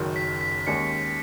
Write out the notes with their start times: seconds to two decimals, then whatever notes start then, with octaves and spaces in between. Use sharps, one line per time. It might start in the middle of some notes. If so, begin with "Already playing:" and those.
Already playing: F#1 F#2 D#3
0.16 B6
0.41 B6
0.67 D#2 D#3 G#3 C#4 C#7